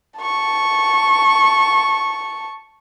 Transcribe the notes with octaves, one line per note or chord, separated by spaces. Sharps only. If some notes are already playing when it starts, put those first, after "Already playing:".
A5 C#6